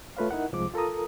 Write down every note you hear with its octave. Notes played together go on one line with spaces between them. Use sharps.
A3 F4 B4 C#5 F5
D#4 E4 A#4 F#5
C2 F3 G#3 D6
F4 A4 A#4 A#5 D#6